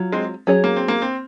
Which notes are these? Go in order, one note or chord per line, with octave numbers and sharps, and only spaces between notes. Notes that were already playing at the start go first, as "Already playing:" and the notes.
Already playing: F#3 F4
G#3 C4
F#3 C#4 G#4 C#5
A#3
C4
A#3
C4